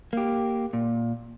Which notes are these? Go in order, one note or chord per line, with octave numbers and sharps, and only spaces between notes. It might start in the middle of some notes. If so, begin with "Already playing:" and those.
A#3 G4
A#2